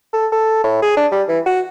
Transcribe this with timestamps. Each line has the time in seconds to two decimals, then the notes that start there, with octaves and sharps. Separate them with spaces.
0.13 A4
0.32 A4
0.64 A2
0.82 G#4
0.97 D4
1.11 G3
1.28 E3
1.46 F#4